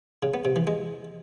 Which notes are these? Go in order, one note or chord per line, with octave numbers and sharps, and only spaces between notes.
C#3
B3
C3
E3
G#3